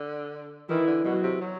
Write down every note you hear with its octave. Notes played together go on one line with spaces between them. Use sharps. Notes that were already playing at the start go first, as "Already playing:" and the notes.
Already playing: D3
D#3 E3 E4
D3
B2 F#3 F#4
C3
F#3